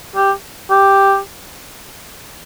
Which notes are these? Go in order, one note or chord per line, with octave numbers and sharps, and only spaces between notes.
G4
G4